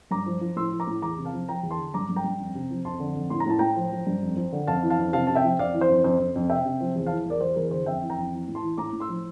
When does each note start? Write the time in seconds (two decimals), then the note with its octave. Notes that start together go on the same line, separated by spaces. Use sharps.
0.11 G2 A#5 D6
0.26 F3
0.41 F3
0.56 A2 C6 E6
0.72 F3
0.80 A#5 D6
0.87 A2
1.02 E2 A#5 D6
1.18 C3
1.25 F5 A5
1.33 F3
1.49 F3 G5 A#5
1.63 E2
1.71 A5 C6
1.78 D3
1.94 G2 A#5 D6
2.09 G2
2.16 G5 A#5
2.24 G2
2.40 F2
2.55 C3
2.70 F3
2.85 F2 A5 C6
3.00 D3
3.15 F2
3.30 A2 C6
3.40 A#5
3.46 A2 A5
3.59 A2 G5 A#5
3.76 F3
3.92 F3
4.07 G2
4.23 F2
4.37 F3
4.53 D3
4.67 F2 F5 A5
4.83 E3
4.90 F5 A5
4.99 F2
5.13 C3 F5 A5
5.27 C3 A5
5.35 E5 G5
5.44 F3
5.59 F2 D5 F5
5.74 E3
5.81 C5
5.89 F2
6.04 F2 C5
6.19 F2
6.35 F2
6.50 C3 E5 G5
6.65 C3
6.81 F3
6.96 E2
7.06 E3 F5 A5
7.26 E2 A#4 D5
7.41 E2 C5
7.56 E2 A#4
7.71 D3 C5
7.86 F2 E5 G5
8.02 E3
8.10 G5 A#5
8.18 F2
8.33 E3
8.48 A2
8.55 A5 C6
8.62 E3
8.78 A2 A#5 D6
8.93 A2
9.00 C6 E6
9.09 F3